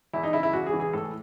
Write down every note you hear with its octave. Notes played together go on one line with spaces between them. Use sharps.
E2 E4
D#4
C#3 E4
E4
E2 F#4
G#4
E3
G#4
A2 A4